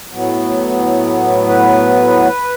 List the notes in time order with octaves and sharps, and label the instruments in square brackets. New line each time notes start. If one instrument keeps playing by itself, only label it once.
[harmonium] A2 F#3 B3
B4